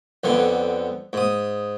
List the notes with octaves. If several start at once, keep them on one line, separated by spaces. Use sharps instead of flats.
F2 D3 B3
G#2 D#6